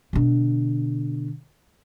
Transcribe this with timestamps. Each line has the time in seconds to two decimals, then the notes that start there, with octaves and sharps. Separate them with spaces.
0.13 B2 D3